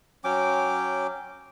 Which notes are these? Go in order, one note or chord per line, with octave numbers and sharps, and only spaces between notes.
F#3 C#4 G5 D6